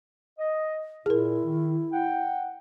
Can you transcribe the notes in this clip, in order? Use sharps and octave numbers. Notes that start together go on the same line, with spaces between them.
D#5
A#2 E4 G#4 A#4
D#3
F#5 G5